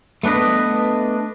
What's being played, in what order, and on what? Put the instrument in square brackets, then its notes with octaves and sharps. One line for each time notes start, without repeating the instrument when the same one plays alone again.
[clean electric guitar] A3 B3 D4 B4 D#5